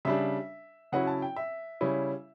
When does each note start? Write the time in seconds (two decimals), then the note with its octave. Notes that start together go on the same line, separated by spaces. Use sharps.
0.05 C#3 G3 D4 E5
0.92 C#3 F#3 C#4 E4 F#5
1.07 A5
1.22 G5
1.36 E5
1.81 C#3 G3 C#4 E4